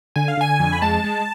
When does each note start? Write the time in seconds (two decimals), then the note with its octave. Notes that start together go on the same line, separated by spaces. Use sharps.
0.16 D3 G#5
0.28 F5
0.37 D3 G#5
0.59 F2
0.72 B5
0.82 G#3 A5
1.04 G#3